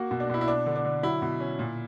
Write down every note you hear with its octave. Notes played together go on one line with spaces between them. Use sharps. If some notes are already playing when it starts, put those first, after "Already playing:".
Already playing: A#3 F#4
B2
D4
B2 E4
E4
D4
D3
D4
D3
F#3 E4
B2
C#4
A#2